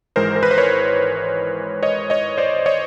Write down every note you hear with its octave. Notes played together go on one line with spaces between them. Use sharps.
G#1 G#2 E3 G#3 A#4 C5
A#4
B4
C5
B4 C#5
C#5 D#5
C#5 D#5
C5 D5
C#5 D#5